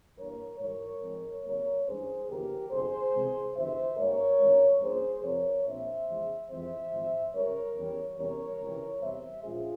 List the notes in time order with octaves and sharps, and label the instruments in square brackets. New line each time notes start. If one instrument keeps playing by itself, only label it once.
[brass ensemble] G2 E3 G3 A#3 A#4 C#5
G#2 E3 G3 A#4 C#5
G#2 F3 G#3 C4
G#1 G#2 G3 A#3 A#4 C#5
G2 E3 G#3 C#4 G#4 C5
G1 F2 C#3 E3 A#3 G4 A#4
G1 F2 C3 G#4 C5
C2 C3 E3 G#3
G1 F2 C#3 E3 G3 C5 E5
G#2 G3 A#3 C#4 A#4 C#5
G#1 G2 E3 G#3 C#4
G2 F3 A#3 C#4 G#4 C5
F2 C3 F3 C4 A#4 C#5
A#1 A#2 F3 C4 C5 E5
E2 C#3 F3 G#3
F2 E3 G#3 C4 C5 E5
G#1 G#2 F3
C#2 C#3 G3 A#4 C#5
E2 E3 G3 C#4
E2 C3 G3 C#4 A#4 C#5
C#2 C3 E3
E2 C3 G3 C4 C5 E5
A#1 A#2 G#3 C#4 F4 G#4